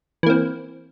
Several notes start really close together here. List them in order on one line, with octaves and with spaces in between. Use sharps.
E3 A#3 C4